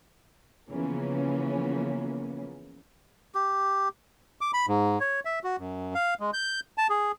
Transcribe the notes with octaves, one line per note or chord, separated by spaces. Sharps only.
C#3 E3 F3 A#3 B3 C#4
G4
D6
B5
G#2
C#5
E5
F#4
F#2
F5
G#3
G6
A5
G#4